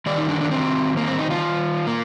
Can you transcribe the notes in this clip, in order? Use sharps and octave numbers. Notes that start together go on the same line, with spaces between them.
D#3 G3 A#3 D5
D#4
D4
D4
C4
A#3
C4
D#4
F4
A#3